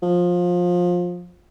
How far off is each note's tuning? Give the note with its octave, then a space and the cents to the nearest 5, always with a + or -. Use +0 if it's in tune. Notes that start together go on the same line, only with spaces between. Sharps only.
F3 +20